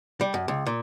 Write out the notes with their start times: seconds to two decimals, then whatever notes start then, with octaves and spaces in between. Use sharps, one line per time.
0.21 G3
0.34 F#2
0.48 C#2
0.66 A#2